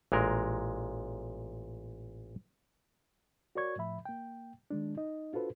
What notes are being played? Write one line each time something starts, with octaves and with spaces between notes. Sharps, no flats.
A1 A#2 G#3 A#4
F#4 A#4 C#5 D5 C#6 G#6
A2 F3 E5 B5
A#3 G5
D#3 G#3 D4
D#4 D#5
D4 F4 F#4 A4 B4 C5